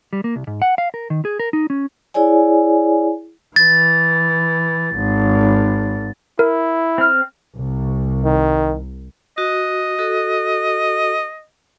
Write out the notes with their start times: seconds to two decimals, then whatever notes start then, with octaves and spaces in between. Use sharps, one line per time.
0.13 G3
0.24 A#3
0.36 C2
0.47 G#2
0.62 F#5
0.78 F5
0.94 A#4
1.10 D#3
1.25 G#4
1.39 A#4
1.53 D#4
1.70 C#4
2.14 E4 G#4 C#5 D5 G#5
3.56 E3 A6
4.96 G#1
6.39 E4 A#4
6.98 C4 F6
7.58 C2
8.24 D#3
9.38 F#4 D#5
9.99 F#4 A4